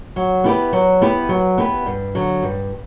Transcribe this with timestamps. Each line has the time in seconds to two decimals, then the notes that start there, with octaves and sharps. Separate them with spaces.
0.16 F#3
0.44 B3 E4 G4 B4
0.73 F#3
1.01 B3 E4 G4 B4
1.29 F#3
1.58 B3 E4 G4 B4
1.86 G2
2.15 D3 F#3
2.42 G2